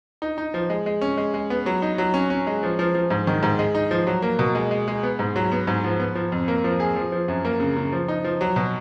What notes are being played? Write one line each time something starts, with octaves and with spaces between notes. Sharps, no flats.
D#4
D#4
F3
G#3
G#3
C#4
G#3
G#3
B3
F#3
D#4
F#3
C#4
C#4
G#3
F3
F3
F3
G#2
D#3
G#2
G#3
D#4
F3
F#3
A#3
B2
G#3
G#3
G#3
B3
G#2
F#3
B3
G#2
F3
B3
F3
F2
A#3
F3
G#4
F3
F3
F#2
A#3
C#3
C#3
F3
D#4
F3
F#3
B2